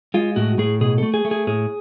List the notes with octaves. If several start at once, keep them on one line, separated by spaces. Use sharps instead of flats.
G#3 F4
A2 F#4
A2 G#4
B2 G#4
A3 A4
G#4
A3
G#4
A2 G#4